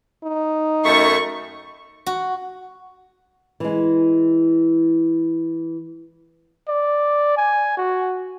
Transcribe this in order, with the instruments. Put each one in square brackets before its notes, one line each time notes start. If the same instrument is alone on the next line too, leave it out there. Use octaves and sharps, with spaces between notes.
[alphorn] D#4
[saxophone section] F#2 D#3 A3 [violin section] C#6
[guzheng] F#4
[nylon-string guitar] E3 G#3
[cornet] D5
G#5
F#4